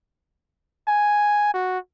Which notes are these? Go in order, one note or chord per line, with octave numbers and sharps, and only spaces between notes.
G#5
F#4